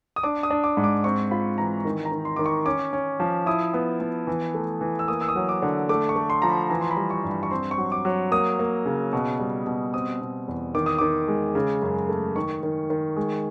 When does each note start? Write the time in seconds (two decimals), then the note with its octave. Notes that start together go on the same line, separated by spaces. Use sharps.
0.16 D#6
0.23 D4 D6
0.43 D#6
0.50 D4
0.64 D6
0.77 G#2
0.84 D6
1.04 C4 C#6
1.31 F4 B5
1.58 E3 A#5
1.85 D#3
2.05 A#5
2.12 D#3
2.25 C6
2.36 D#3 D6
2.46 C#6
2.66 C#4 D6
2.93 C#4
3.20 F3
3.46 E4 D#6
3.74 B3
4.01 B3
4.27 E3
4.54 A3
4.81 E3
4.99 E6
5.08 A#3 D#6
5.21 E6
5.28 D#6
5.36 F#3
5.49 D6
5.62 D3
5.89 A3 D6
6.09 C#6
6.16 A3
6.30 C6
6.42 F3 A#5
6.50 B5
6.70 E3 A#5
6.81 C6
6.90 B5
6.97 G3
7.11 C#6
7.24 G2
7.30 B5
7.43 C#6
7.51 C4 C6
7.71 C#6
7.78 F#3
7.92 D6
8.05 F#3
8.31 A#3 D#6
8.59 A#3
8.85 C#3
9.13 B2
9.40 G3
9.67 B2
9.94 C4 D#6
10.21 B2
10.48 E2
10.75 D#3 D6
10.86 D#6
10.98 D#3 D6
11.28 G#3
11.55 C#3
11.82 F#2
12.09 A3
12.36 D#3 C#6
12.63 D#3
12.90 D#3
13.16 G#3